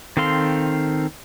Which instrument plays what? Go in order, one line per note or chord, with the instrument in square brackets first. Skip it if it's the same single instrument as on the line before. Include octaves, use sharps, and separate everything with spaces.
[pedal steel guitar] D#3 C4 A4 F5 C6